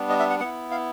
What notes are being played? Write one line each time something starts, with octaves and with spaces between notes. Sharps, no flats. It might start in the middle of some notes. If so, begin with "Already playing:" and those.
Already playing: G3 B3 D4
D#5
E5
F#5
B3 E4 F#5
F5